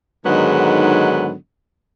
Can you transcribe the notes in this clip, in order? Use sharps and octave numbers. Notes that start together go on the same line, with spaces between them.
G#2 D3 D#3 F#3 G#3 B3